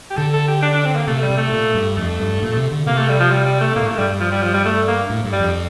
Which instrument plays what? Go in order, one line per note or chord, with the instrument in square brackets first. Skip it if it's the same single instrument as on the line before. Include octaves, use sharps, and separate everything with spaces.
[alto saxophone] G4
[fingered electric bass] D3 [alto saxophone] A4
[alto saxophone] A4
G4
D4
D4
C4
A#3
[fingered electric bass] C3 [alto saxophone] A3
[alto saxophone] G3
[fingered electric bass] C3
[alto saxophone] A3
[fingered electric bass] A#2
G2
[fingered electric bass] F2 [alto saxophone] A3
[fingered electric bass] G2
A#2
C3
D3
[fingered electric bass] C3 [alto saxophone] A#3
[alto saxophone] A3
G3
F3
G3
G3
A3
[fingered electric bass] A#2 [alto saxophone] A#3
[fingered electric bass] A2
[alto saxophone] A3
[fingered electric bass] A#2
[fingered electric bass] G2 [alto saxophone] G3
[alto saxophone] F3
G3
F3
G3
A3
A#3
[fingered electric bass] A2
G2
[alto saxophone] G3
[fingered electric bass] F2